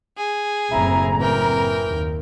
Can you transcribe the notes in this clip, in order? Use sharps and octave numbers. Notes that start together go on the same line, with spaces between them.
G#4
F#1 A2 C4 E4 A#5
E3 A#4 G5
D#2